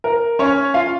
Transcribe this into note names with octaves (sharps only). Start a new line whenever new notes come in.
A#4
C#4 C#5
F4 F5